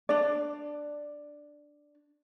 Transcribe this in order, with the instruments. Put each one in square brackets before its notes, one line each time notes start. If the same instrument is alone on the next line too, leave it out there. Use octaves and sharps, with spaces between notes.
[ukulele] D4 D5